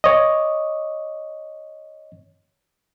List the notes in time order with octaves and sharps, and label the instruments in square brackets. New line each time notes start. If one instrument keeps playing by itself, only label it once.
[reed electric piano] C#5 D#5